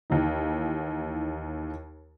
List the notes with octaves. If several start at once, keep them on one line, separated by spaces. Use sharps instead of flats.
D#2 E3 D#4